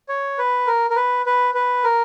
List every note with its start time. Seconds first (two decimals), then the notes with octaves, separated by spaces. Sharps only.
0.09 C#5
0.38 B4
0.67 A#4
0.90 A#4
0.96 B4
1.26 B4
1.54 B4
1.84 A#4